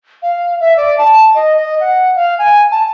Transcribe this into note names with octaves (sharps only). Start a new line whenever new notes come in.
F5
E5
D5
A5
D#5
D#5
F#5
F5
G#5
A5